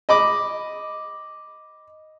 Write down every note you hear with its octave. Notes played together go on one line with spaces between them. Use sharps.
D#5 B5 D6